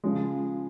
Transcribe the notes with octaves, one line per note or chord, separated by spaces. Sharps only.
C#3 F3 G#3